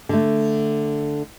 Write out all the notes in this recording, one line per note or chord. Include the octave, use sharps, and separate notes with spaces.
D3 A3